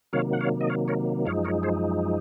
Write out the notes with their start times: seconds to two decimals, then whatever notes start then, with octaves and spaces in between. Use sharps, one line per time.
0.13 C3 D#3 F#3 A#3 C#5 F5
0.33 F#5
0.41 C#5 F5
0.61 D#5
0.69 C#5 F5
0.88 A#4 C#5
1.26 F#2 F3 G#3 D#4 C#5 F5
1.45 A#4 C#5
1.63 G#4 C5